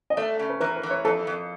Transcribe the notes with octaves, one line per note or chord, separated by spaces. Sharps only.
D#5
A3 D5
C#3
B4
E3 A#4
B4
E3
C#5
F2 A4
F2